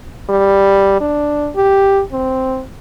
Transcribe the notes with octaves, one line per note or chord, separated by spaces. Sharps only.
G3
D4
G4
C4